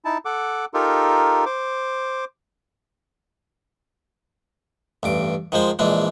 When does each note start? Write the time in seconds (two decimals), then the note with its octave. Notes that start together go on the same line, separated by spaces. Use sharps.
0.05 D#4 E4 A5
0.25 A4 F#5 D6
0.74 D#4 F4 G4 A4 A#4
1.46 C5 D6
5.03 A1 G2 D6
5.52 D#3 F3 G#3 C5
5.79 A#1 E3 G#3 D4